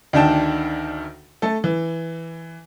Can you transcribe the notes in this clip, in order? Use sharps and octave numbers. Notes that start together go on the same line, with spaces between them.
D2 D#3 D4 G5 A5
A3 A4
E3